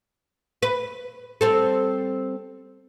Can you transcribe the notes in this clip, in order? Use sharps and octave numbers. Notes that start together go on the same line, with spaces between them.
B4
G3 C4 A4